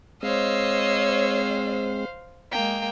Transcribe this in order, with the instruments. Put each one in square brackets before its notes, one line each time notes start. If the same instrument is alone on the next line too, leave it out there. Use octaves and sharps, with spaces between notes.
[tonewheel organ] G#3 C4 [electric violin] C5 F5 [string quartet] C#5 D#5 E6
[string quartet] G#3 A#3 [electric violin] G5